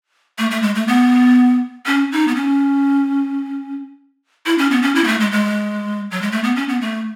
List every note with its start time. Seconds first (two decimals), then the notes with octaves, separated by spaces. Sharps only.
0.38 A3
0.51 A3
0.62 G#3
0.75 A3
0.88 B3
1.86 C#4
2.12 D#4
2.28 B3
2.35 C#4
4.46 E4
4.58 C#4
4.71 B3
4.83 C#4
4.95 E4
5.04 B3
5.07 A3
5.20 G#3
5.32 G#3
6.11 F#3
6.22 G#3
6.32 A3
6.44 B3
6.56 C#4
6.69 B3
6.81 A3